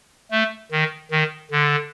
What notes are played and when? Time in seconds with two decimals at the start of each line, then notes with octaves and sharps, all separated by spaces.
0.31 A3
0.72 D#3
1.11 D#3
1.51 D3